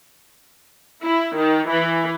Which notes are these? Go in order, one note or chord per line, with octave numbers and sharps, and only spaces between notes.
E4
D#3
E3